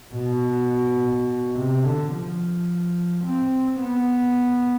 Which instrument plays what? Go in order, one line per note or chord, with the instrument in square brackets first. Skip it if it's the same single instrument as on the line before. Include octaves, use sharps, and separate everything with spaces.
[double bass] B2
C3
D3
F3
C4
B3